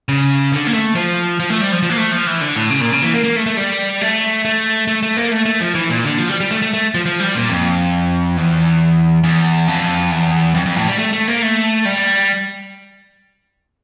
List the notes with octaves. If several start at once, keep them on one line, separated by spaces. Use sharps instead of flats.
C#3
D3
A#3
A3
F3
F3
A3
G3
F3
F3
A#3
A3
F3
E3
D3
A2
C#3
A#2
C#3
E3
A#3
A#3
A3
A3
G3
A3
A3
A3
A3
A#3
A3
A3
F3
E3
A#2
D3
F3
G3
G3
A3
A3
A3
F3
F3
G3
A#2
F2
E2
E2
F2
E2
F2
F2
A2
G3
A3
A3
A#3
A3
G3